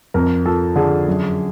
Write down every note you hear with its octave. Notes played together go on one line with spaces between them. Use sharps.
F2 A#4
F3 A4
D3 G#4
F#2